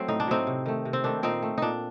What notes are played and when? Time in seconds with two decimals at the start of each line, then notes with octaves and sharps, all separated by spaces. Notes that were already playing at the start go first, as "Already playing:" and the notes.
Already playing: F#3 A3 C4
0.08 A2 D#4
0.20 D4
0.27 F#3 A3 C4 D#4
0.47 C3
0.66 D#3 A3
0.85 C3
0.93 C4
1.04 D#3 A3 D4
1.23 A#2 C4 D#4
1.42 A3
1.58 A#2 D4 D#4